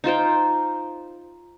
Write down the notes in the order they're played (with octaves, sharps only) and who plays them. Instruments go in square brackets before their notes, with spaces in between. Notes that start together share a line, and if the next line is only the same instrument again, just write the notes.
[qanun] D#4 F4 C5 G5